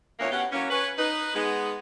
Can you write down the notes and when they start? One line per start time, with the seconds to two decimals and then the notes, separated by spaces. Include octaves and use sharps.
0.20 D2 A#2 E3 A#3 B3 C#5
0.32 B2 B3 C#4 G4 F#5
0.52 E3 F#3 A#3 C#4
0.70 C#4 B4
0.98 D#4 B4
1.35 G#3 B3 D#4